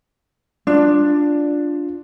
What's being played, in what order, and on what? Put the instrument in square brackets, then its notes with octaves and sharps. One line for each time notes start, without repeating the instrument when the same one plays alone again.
[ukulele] D4 [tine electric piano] F4